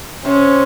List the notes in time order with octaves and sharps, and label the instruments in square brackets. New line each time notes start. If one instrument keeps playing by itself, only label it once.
[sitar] C3 [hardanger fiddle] C#4